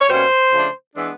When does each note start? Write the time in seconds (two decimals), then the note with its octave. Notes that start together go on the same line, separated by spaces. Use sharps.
0.01 C#5
0.09 B2 G3 A#3 C#4 C5
0.52 C#3 F3 A3 D4
0.96 E3 G#3 B3 D4